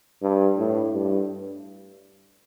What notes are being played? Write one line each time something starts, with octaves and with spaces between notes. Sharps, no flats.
G2
A2
G2